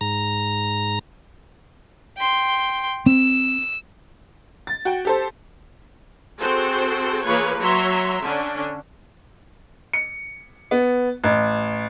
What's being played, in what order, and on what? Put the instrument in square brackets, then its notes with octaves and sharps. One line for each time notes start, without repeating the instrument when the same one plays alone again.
[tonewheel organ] G#2 A#5
[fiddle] G5 C6
[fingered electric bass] C4 [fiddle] E6
[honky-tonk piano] A6
F#4 G5
G4 A4 C5
[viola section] C4 F#4 G#4 A4 C5
E3 A#3 F4 G#4 B4 C#5
F#3 C#5 E5 A#5 C6
D3 C#4 D4
[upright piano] C#7
B3
A1